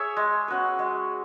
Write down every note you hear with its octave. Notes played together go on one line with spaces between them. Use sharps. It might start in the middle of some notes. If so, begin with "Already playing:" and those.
Already playing: G#4 C#5 E5
G#3
C#4 F#4 B4
G#3